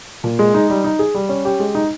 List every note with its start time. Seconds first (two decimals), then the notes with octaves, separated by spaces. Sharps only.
0.24 A#2
0.39 G#3
0.54 D#4
0.70 G3
0.84 D#4
0.99 G#4
1.15 G3
1.29 C#4
1.45 G4
1.60 G#3
1.75 D#4